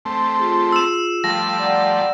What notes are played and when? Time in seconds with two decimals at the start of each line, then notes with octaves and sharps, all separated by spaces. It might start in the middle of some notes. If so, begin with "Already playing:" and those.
0.05 A3 C4
0.38 F4 G#4
0.72 E6 E7
1.24 F3 G3 A3 A#6
1.59 D5 F#5 A#5